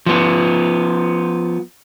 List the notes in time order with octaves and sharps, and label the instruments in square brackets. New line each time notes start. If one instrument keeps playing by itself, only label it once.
[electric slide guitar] F3 B3